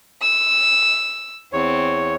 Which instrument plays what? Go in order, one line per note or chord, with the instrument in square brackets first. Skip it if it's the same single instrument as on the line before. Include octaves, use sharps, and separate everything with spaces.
[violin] E6
[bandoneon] E2 C#5 [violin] C4